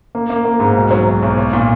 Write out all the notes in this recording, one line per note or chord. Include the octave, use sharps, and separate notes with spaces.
A#3
A#3
A#3
G#2
B1
F#3
B1
B1
B1
A#2